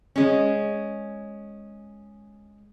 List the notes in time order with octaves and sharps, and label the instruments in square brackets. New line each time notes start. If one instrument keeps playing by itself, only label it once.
[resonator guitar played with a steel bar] G#3 C#4